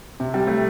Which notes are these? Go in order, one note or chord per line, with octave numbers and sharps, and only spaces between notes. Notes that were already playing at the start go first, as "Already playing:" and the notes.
C3
G3
A3